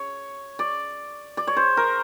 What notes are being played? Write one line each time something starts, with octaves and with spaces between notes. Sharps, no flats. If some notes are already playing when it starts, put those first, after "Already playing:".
Already playing: C#5
D5
D5
C#5
C5
A#4